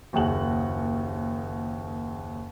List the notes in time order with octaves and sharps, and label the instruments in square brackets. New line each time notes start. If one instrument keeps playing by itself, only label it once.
[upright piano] F#1 D#2 G#4 F#5 F#7